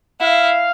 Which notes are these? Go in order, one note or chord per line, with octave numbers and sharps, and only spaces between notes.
E4 F5